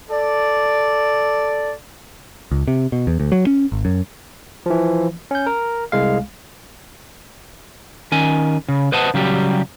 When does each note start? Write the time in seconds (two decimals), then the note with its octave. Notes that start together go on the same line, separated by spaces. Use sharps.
0.10 A4 D5
2.51 C#2
2.68 C3
2.92 B2
3.07 E2
3.20 D2
3.32 F#3
3.47 C#4
3.72 G#1
3.85 F#2
4.66 E3 F3
5.31 C#4 G6
5.46 A#4
5.92 C2 G#3 F5
8.12 D#3 C#4 G#5
8.68 C#3
8.92 B4 C5 D#5 F#5 A5
9.14 C#3 F#3 G3 G4